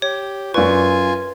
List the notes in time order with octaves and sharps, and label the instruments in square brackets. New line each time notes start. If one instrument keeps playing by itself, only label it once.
[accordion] G4 [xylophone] C#5
[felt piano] F#2 D5 C#6 [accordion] F4 G#5 [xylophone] B4